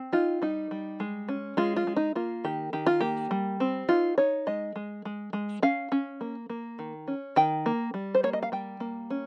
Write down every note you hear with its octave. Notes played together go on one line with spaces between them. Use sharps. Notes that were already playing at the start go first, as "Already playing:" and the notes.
Already playing: C4
D#4 F4
G3 D#4
G3
G#3
C#4
G#3 F4
F4
G#3
D#4
A#3 F4
D#3 G4
D#3 G4
F4
A#3 G4
G3
C4
D#4 F4
D#4 C#5
G#3 D#5
G#3
G#3
G#3
C#4 F5
C#4
A#3
A#3
D#3
C#4
D#3 G5
A#3
G3
C5
A#3 C#5
D#5
F5
G3 G5
A#3
C#4